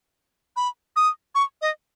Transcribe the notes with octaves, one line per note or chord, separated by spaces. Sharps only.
B5
D#6
C#6
D#5